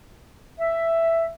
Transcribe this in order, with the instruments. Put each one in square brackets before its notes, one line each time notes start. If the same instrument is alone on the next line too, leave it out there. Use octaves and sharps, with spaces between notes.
[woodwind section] E5